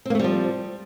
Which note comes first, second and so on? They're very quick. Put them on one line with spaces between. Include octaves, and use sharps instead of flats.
C4 A#3 A3 G3 F3